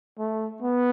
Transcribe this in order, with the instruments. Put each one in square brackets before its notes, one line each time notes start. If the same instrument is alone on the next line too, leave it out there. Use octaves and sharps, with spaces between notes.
[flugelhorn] A3
B3